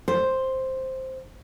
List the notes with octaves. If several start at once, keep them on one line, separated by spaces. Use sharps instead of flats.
C5